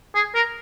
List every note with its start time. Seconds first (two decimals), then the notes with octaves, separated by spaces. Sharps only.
0.15 G#4
0.35 A#4